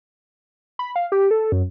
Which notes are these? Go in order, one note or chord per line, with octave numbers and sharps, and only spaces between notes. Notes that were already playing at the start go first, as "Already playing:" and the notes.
B5
F5
G4
A4
F#2